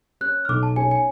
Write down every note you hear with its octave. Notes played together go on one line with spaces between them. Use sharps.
C#4 F#6
F6
B1 D6
A5
C#4 G#5
G#5